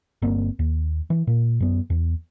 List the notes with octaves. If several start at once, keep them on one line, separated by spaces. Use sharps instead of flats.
G1 A#3 C4
D#2
E3
A#2
F#2 B3
E2